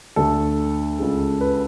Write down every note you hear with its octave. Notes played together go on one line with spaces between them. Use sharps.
D2 D3 A3 A4
C#2 C#3 G#3
B4